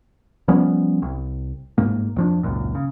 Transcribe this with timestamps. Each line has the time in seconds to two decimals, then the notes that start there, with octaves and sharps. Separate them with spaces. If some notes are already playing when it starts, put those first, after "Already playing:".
0.48 F3 G3 B3 C#4
1.02 C2
1.78 G1 G#2 A#3
2.16 F2 F3 D4
2.43 G#1 C#2 F#2 A#2
2.75 C#3